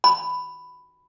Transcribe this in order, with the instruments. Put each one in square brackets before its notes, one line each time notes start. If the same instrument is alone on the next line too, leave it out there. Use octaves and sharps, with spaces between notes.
[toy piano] B5